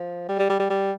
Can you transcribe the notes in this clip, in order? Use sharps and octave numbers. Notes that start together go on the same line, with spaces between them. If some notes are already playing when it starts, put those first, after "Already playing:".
Already playing: F3
G3
G3
G3
G3
G3